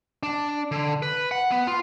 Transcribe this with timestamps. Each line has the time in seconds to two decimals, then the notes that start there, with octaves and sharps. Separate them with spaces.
0.23 D4
0.72 D3
1.02 B4
1.31 F#5
1.51 B3
1.67 F4